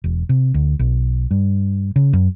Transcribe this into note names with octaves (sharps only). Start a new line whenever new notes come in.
E1
C3
D2
B1
G2
C#3
F#2